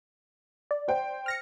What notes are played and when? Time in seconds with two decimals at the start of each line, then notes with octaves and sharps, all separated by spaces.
0.71 D5
0.88 C5 G5
1.26 F6 A#6 C#7